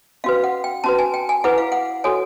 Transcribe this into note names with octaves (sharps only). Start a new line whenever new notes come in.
C#4 F#4 B4 F5
F#5
G5
C#4 F#4 B4 A5
G#5
G5
G#5
E4 G#4 B4 F#5
F5
F#5
F#4 A4 C#5 G#5